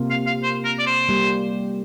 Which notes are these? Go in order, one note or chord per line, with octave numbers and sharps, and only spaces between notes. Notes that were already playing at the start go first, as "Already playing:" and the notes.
Already playing: C3 A#3 F4
F5
F5
C5
A#4
D5
C5
G3 A#3 G4